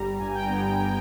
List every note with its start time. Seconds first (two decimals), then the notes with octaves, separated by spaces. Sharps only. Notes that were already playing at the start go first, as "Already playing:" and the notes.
Already playing: G1 G3 A#5
0.19 G2 G#5
0.35 G5
0.48 B3 A#5